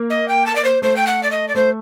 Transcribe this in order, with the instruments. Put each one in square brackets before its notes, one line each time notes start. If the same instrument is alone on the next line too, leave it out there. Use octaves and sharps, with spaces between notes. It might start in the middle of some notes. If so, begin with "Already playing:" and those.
Already playing: [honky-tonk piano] A#3
[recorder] D#5
G5
A5
D5
C5
[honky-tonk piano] A3 [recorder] C5
[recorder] G5
F#5
D5
D#5
D5
[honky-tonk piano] A3 [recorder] C5